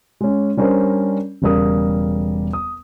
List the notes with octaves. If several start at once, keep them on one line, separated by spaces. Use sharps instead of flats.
G#3 C#4
G3 C#4 D4 A#4 C5
E1 C#3 G3 A#4 D#6
D#6